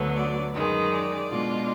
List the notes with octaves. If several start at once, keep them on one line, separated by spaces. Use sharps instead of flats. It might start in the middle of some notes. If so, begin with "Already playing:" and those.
Already playing: D2 D3 F#3 B3
D5
F#2 D#3 G#3 B4
D5
B2 G#3 D4 F4